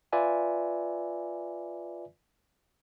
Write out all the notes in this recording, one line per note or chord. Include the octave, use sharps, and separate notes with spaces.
F4 B4 D5 E5 G#5